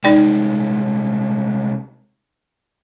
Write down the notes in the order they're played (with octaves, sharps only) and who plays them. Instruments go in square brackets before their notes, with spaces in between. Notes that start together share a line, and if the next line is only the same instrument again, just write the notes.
[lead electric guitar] C2 G#3 [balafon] D#4 D5 G5